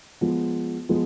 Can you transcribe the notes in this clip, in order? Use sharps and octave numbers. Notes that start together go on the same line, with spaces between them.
F3 G#3 B3
F3 G#3 B3